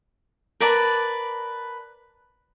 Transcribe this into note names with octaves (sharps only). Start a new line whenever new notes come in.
A#4 B4 D5 A5